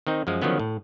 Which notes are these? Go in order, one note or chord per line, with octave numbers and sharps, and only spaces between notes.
D#3 C4 D#4
F#2 F3 G#3
D3 D#3 F3 F#3 B3 C#4
A2